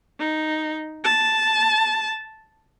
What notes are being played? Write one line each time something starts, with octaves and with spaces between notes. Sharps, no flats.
D#4
A5